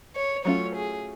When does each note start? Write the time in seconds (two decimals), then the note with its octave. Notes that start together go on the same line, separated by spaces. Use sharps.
0.16 C#5
0.45 F#3 A3 C#4 F4 C#5
0.76 G#4